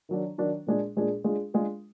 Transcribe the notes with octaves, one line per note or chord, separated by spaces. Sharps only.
D#3 F#3 D4
D#3 F#3 D4
A#2 G#3 D4 G#4
A#2 G#3 D4 G#4
G#3 D4 F4 G#4
G#3 D4 F4 G#4